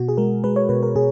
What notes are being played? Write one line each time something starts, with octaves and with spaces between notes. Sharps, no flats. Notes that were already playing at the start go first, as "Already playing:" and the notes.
Already playing: B2 F#4
G#4
G#3 A#4
G#3 B4
C#5
B2 B4
A#4
B2 G#4